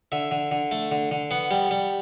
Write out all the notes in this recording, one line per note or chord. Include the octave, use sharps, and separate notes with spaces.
D3 E5
D3
D3
A3
D3
D3
B3 F#5
G3
G3